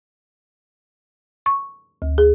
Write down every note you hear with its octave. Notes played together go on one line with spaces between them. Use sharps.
C#6
D2
G#4